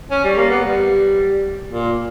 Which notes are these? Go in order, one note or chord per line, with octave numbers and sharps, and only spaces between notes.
C#4
G3
A#3
B3
G3
A#2